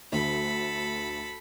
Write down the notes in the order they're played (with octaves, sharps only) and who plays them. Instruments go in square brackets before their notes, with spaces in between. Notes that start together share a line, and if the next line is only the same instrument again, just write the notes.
[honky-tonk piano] D2 D3 [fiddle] A4 B5